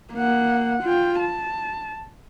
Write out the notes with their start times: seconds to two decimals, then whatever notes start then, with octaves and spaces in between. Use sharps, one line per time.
0.14 A#3 F#5
0.83 F4 G5
1.19 A5